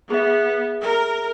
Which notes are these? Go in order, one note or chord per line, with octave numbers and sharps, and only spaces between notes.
B3 G#4 E5
A#4